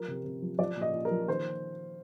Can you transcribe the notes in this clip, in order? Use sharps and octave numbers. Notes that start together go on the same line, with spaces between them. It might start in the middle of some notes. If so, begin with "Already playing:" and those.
Already playing: F3 A#4
C3
C3
F3
F3 D5
A#2
D#5
A#2
A#4
F3
D#3 C5